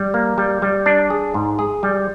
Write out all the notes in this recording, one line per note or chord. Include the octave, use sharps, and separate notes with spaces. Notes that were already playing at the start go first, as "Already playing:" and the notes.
Already playing: G3
A#3
G3
G3
D4
G#4
G#2
G#4
G3